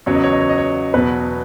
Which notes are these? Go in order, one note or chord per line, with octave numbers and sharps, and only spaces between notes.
E2 C#3 F#3 C#5
D#5
C#5
D#5
C#5
D#5
C#5
E2 B2 F#3 B4